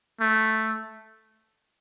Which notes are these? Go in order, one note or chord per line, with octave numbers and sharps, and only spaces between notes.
A3